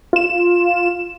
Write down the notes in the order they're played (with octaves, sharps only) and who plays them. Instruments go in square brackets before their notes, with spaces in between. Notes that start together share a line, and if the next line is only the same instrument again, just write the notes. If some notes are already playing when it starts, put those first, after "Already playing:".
[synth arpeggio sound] F4 E7